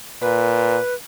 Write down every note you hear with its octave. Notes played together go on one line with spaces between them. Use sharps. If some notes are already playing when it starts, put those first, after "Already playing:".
A#2 B4